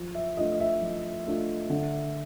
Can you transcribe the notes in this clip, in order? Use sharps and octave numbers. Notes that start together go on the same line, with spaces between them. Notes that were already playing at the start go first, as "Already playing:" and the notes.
Already playing: F3
E5
A3 D4 F4 D#5
D#5
E5
F3
A3 D4 F4
D3